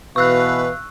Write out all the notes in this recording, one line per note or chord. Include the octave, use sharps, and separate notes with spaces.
B2 E3 B4 F5 C#6 E6 F#6